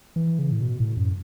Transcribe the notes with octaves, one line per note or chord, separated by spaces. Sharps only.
E3
C#3
A2
B2
A2
F#2